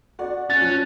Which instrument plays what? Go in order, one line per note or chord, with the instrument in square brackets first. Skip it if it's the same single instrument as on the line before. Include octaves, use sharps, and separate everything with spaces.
[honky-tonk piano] F#4 D5
[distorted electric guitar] C#4 [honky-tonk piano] F#6 [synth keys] A6
[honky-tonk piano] F3